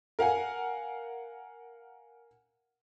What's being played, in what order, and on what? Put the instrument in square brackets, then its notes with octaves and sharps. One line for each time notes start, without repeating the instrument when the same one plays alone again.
[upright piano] A#4 F5 F#5 G#5